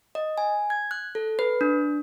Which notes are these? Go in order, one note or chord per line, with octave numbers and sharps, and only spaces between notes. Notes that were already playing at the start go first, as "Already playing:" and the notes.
D#5
G#5
G#6
F#6
A4
B4
D4